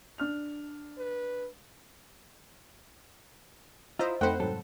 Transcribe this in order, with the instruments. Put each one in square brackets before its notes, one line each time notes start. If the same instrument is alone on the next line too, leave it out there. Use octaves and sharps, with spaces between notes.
[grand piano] D4 F6 F7
[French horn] B4
[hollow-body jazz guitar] E4 F4 [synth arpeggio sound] C5 D#5 A#5 [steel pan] E5
[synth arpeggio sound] F2 B5 [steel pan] A3 F#5 [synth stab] C4 C5 G5 [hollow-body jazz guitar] D#4
[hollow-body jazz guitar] C2 A4 [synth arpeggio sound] G#2 F#3